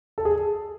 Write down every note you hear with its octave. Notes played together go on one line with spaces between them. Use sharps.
A4
G#4